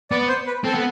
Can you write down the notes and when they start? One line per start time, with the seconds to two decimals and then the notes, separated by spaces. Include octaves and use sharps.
0.11 B3 D5
0.28 C5
0.47 B4
0.64 C4 A4
0.75 B3